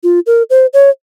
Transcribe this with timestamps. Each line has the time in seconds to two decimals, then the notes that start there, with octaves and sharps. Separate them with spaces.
0.03 F4
0.27 A#4
0.50 C5
0.73 C#5